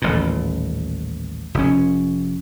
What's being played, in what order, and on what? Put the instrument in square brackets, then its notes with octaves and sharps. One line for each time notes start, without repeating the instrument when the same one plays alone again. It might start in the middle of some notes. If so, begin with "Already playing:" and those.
[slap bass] D#1 A1 A#2
F1 C#4